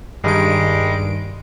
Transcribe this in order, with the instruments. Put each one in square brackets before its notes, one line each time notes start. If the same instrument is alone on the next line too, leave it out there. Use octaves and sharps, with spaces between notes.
[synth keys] G2 D#3 D7 [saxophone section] G3 G#3